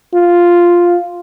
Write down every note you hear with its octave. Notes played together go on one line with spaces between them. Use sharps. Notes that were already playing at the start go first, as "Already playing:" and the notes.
F4